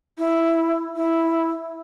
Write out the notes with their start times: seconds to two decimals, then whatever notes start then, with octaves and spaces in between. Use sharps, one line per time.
0.18 E4
0.95 E4